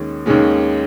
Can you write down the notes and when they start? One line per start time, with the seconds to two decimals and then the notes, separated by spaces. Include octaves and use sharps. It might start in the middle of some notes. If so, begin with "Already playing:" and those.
Already playing: D#2 D#3 G#3 C#4
0.26 D#2 D#3 G#3 C#4